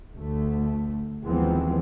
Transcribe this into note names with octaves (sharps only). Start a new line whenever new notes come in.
D2 A3
D#2 E3 F3 G#3 B3 C4